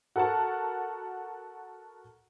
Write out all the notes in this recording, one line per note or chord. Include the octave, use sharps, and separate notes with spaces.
F#4 A4 A#4 F#5 A5